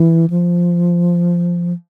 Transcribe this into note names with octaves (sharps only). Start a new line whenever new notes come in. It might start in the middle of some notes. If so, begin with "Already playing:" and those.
Already playing: E3
F3